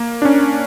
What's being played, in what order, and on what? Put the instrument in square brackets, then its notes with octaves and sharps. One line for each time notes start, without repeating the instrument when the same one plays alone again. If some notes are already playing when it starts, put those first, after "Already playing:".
Already playing: [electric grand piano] A#3
D4
C#4